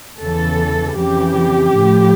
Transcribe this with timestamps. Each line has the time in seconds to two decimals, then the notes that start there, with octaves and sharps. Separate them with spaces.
0.20 E2 C#3 E3 A4
0.97 F2 C#3 E3 G4
1.74 A2 F3